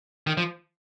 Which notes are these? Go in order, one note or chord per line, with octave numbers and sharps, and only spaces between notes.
D#3
F3